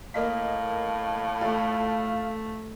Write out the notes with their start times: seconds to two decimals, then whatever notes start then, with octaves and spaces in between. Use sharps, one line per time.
0.14 A2 A#3 D#5 F5 B6
1.41 A3 F4 A4